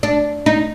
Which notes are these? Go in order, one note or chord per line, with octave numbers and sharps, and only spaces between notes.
D4
D#4